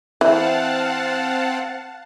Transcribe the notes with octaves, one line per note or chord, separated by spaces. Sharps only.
E3 C4 F5 F#5 A5